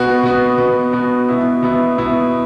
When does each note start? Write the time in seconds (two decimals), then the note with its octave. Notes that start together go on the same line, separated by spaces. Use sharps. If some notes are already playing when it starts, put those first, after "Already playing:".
Already playing: B2 B3 F#4
0.23 B2 B3 F#4
0.58 B2 B3 F#4
0.93 B2 B3 F#4
1.29 B2 B3 E4
1.63 B2 B3 E4
1.98 B2 B3 E4